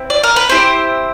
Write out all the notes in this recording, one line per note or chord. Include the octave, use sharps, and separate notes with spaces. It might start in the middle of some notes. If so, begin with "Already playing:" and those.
Already playing: C4 E4
D5
A#4
B4
C4 E4 G4 C5